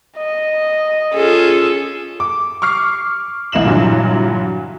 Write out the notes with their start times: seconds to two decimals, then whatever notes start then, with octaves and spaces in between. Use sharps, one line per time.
0.18 D#5
1.14 C#4 F4 G#4 A4
2.20 D6
2.62 C#6 D6 F6 C7
3.52 C2 E3 D#5 E7 F#7
3.65 G2 A#2 D3 E3 F#3